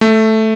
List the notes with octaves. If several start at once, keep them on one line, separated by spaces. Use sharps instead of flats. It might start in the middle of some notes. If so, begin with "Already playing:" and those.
A3